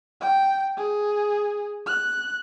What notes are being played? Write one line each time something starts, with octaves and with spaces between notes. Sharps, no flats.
G5
G#4
F#6